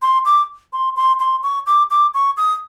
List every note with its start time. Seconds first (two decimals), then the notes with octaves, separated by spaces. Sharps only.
0.02 C6
0.25 D6
0.73 C6
0.96 C6
1.20 C6
1.43 C#6
1.67 D6
1.90 D6
2.14 C#6
2.37 D#6